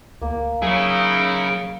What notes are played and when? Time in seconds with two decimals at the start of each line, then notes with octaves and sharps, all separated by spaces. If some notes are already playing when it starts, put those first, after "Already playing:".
0.22 D2 A#3
0.62 F#3 D#4 E4 G#4 C#5